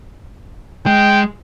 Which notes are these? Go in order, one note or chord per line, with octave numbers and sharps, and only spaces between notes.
G#3 G5